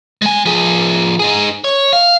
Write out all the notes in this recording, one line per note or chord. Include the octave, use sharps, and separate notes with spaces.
G#3 G#5
F3 G#4
D#4 G#4
C#5
F5